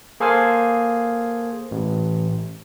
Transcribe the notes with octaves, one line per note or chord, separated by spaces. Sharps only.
A#3 G#4 A4 C5 F5 G#5
A1